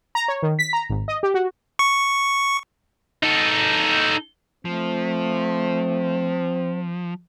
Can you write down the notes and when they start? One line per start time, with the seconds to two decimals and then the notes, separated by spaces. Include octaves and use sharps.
0.15 A#5
0.28 C#5
0.42 D#3
0.59 B6
0.73 A#5
0.90 G#1
1.08 D#5
1.23 G4
1.34 F#4
1.79 C#6
3.23 D#4 A4
4.65 F3 A3 C4